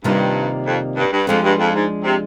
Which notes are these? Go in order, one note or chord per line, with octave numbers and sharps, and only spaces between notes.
G2 C3 D#3 G3 A#3 F4
F2
G2
G2
F2 F3 G#3 D4
G2
F2
G#2
C3